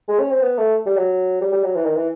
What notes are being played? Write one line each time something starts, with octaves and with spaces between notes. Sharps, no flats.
G#3
C#4
C4
B3
A3
G3
F#3
G3
G3
F#3
E3
D#3
E3